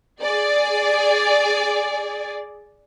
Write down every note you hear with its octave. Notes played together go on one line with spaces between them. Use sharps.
G#4 D5